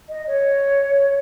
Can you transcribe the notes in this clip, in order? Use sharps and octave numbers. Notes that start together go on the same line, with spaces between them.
D#5
C#5